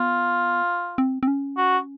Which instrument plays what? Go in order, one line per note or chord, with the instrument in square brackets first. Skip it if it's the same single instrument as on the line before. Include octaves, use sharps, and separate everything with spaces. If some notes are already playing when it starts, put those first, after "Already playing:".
Already playing: [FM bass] B3 [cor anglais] F4
[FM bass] C4
C4
C#4
[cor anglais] F#4